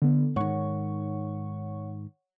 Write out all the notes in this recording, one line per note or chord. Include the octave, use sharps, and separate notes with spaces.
D3 B3
G#2 D#3 C#5 F#5 C#6